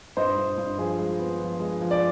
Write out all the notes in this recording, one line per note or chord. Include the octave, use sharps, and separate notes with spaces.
G2 C5 D#5
G2
G2
F3 G#4 C5
G#3
B3
F3
G#3
F3
D5